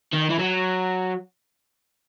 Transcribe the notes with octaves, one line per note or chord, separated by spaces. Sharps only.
D#3
E3
F#3